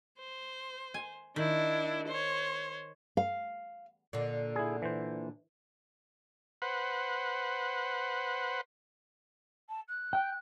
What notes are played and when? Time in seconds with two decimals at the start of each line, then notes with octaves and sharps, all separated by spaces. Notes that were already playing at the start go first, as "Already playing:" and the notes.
0.19 C5
0.94 G#5
1.36 D#3 D4 E4
2.07 C5 C#5
3.17 F5
4.13 A#2 D3 A#3
4.56 E4 G#4
4.82 E3 C5
6.62 B4 C5 F#5
9.69 A5
9.88 F#6
10.13 G5